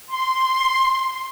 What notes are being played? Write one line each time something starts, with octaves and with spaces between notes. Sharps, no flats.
C6